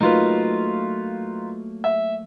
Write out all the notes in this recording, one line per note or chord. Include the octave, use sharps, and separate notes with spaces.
F#3 A3 A#3 D#4 F4 B4
E5